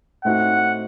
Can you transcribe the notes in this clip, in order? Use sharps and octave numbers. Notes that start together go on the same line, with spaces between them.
A2 A3 C4 D#4 F#4 F#5